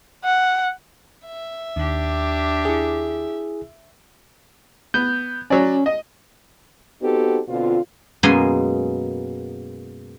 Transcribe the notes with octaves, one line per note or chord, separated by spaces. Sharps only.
F#5
E5
D#2 D4 G4
E4 G#4
B3 G6
F#3 C#4 D5
D#5
B3 C4 D#4 F#4 G4 A4
B2 D3 C4 F4
F#2 B2 G#3 A#3 D#5 G#5